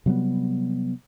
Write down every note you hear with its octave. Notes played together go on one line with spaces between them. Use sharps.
C3 F#3 G3 B3